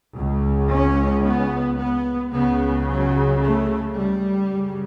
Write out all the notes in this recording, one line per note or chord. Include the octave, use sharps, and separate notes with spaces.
C#2 C#3
C#4
B3
B3
C#2 C#3 B3
F#3
A3
G3
F#2 C#3